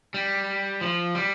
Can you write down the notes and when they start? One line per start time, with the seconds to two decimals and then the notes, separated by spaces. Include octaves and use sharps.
0.14 G3
0.81 F3
1.15 G3